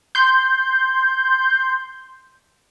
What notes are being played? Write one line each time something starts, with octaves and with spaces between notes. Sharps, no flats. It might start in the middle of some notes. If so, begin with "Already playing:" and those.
C6 G6